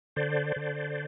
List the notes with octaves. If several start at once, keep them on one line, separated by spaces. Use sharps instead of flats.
D3 C5 D5
D3